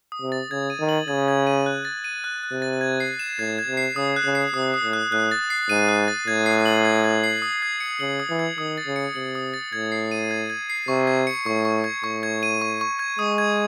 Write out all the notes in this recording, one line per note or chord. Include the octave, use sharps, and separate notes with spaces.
D#6
C3
A6
C#3 G#6
D#7
D#3
F#7
C#3 G#6
G#6
D#7
F#6
A6
D#7
F#6
F#6
C3
A6
G#6
C7
E7
A2 G#6
G#6
C3
C7
C#3 D#6
F#6
C#3
C7
C3 D#6
D#6
A2
F#6
A2 F#6
A6
C7
G#2 D#7
F#6
A6
A2 G#6
C7
F#7
G#6
G#6
C7
D#6
G#6
C#7
C#3 F#7
D#6
E3
G#6
D#3 D#6
A6
C#3
C#7
C3 F#7
D#6
A6
A2 G#6
C7
D#7
G#6
G#6
C7
C3 C#6
G#6
C#7
A2 C#6
C#6
G#6
A2 C#6
G#6
D#7
C#6
C#6
G#6
G#3 D#6
G#6